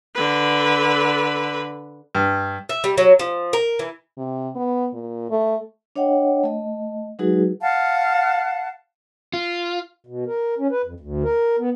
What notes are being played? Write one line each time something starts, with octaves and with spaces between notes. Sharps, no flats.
D3 B4
G2
E5
G3
F#3
F3
A#4
E3
C3
B3
A#2
A3
D4 C#5 D#5 F#5 G5
A3 D#5
F#3 G#3 D#4 F#4 G#4 B4
F5 F#5 A5
F4
B2
A#4
C#4
B4
F2
D2
A#4
B3